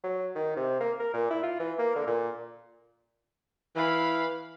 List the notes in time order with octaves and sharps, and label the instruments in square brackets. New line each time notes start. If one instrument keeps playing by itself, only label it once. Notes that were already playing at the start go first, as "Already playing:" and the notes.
[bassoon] F#3
D#3
C3
A#3
A#4
A#2
E4
F4
E3
A#3
D3
A#2
[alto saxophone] E3 [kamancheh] F5 B5